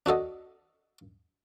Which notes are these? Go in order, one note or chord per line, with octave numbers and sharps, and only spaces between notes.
D4 F#4 A4 D#5